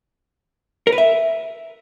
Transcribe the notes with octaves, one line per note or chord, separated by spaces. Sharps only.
A#4
B4
E5